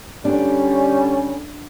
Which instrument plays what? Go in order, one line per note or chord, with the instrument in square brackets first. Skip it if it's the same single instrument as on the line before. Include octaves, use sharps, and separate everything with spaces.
[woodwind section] D3 G3 [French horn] C#4 [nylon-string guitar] D4